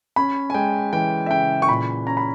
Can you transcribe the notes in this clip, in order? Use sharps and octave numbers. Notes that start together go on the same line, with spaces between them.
C#4 B5
G#5
G#3 G5
E3 G5
E5
C#3 G5
C#6
A#2 B5
C#4 A#5
B5